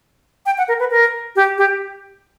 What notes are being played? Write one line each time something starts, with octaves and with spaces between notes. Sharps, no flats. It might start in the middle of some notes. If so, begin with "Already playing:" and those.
G5
F#5
A#4
B4
A#4
G4
G4